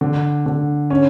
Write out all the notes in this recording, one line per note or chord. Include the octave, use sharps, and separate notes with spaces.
D3
D3
C#4